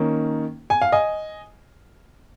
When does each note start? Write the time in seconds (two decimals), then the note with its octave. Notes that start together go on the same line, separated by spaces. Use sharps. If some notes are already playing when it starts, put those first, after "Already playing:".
Already playing: D#3 A#3 C#4
0.70 G#5
0.82 F5
0.92 D#5 G#5